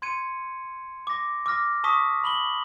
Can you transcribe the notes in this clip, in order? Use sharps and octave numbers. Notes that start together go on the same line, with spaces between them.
C6 G#6 C#7 D#7
D6 A#6
D6 E6 F6 A#6
A5 C#6 D#6 B6
B5 F#7 G7